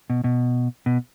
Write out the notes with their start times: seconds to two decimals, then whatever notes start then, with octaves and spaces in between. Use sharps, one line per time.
0.10 B2
0.24 B2
0.86 B2